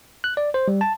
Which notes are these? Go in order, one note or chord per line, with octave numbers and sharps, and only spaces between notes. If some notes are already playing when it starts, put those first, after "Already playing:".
F#6
D5
C5
G3
A5